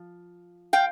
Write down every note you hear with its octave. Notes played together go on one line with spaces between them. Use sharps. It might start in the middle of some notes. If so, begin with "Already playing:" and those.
Already playing: F3
F5 G5